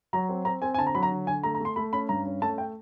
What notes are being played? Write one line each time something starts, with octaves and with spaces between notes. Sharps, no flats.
F#3 A#5
C4
C4 A#5
C4 G#5
G#5
D3 A5
A#5
F#3 B5
A#5
D3
D3 G#5
A3 A#5
A#5
A3 C6
A3 B5
C#4 B5
G2 A#5
C#4
A3 A5
G5